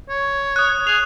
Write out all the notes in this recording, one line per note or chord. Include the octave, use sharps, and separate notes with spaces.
C#5
D#6 F#6
G#4 F7